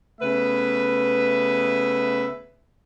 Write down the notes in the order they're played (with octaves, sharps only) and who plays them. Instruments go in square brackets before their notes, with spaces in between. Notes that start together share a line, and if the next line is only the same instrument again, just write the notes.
[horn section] C#3 A3 B3 B4 E5